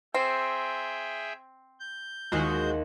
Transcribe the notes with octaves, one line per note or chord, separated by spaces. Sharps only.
C4 G#4 E5 G5
G6
D#2 G#3 F4 F#4 C5